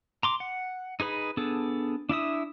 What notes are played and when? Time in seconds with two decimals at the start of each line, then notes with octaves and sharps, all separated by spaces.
0.23 A#5 C6 D6
0.40 F#5
1.00 D#4 G#4 B4 B5
1.37 B3 D4 G#4 A4
2.09 D4 E4 E5 D#6